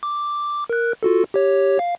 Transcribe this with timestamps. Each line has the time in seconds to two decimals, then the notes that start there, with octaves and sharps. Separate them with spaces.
0.03 D6
0.70 A#4 F#6
1.03 F4 F#4 A4
1.34 G4 C#5
1.79 F5